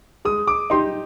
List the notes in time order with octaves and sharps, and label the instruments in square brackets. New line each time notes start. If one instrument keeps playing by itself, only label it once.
[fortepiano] G#3 [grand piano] D#6
[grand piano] D6
[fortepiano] D#4 G4 [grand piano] C6